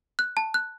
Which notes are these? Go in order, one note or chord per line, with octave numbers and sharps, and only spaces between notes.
F#6
A5
F#6